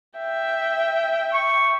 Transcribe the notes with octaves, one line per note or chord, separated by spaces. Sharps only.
E5 G5
C#6